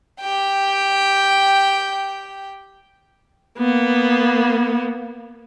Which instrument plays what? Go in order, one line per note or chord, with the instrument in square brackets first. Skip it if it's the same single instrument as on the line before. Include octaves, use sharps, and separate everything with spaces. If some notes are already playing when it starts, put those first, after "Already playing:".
[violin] G4 G5
[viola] A#3 B3